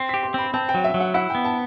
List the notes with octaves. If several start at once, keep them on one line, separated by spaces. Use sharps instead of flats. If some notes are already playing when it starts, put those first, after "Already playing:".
Already playing: C4 C7
G4 B6
C6
C4 B5
C4 A5
G5
F#3
E5
F#3
F#5
E4 F#5
B3 G5
A5